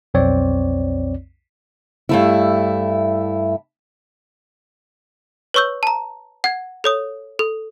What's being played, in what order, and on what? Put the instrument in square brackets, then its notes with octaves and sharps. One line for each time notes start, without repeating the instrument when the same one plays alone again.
[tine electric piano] B1 F2 C4 C#5 D5
[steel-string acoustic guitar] G2 A3 E4
[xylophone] B4 C#5 C#6 E6 G6
A5 A#5
F#5 G#6
A4 C#5 D#6
A4